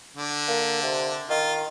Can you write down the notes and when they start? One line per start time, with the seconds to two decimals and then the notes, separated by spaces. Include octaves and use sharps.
0.16 D3
0.48 A#3
0.83 C3
1.30 D#3 F4